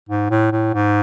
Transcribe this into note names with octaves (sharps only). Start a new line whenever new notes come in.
G#2
A2
A2
G#2